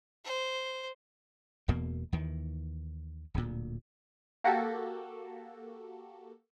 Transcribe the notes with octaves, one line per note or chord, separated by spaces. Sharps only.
C5
E1 E2 B2 A#3
D#2 D#3 E3
D1 D2 A#2
A#3 F#4 G4 A4